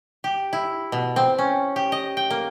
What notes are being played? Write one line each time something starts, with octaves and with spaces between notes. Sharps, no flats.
G4
E4
B2
C4
C#4
G4
D#5
G5
A#3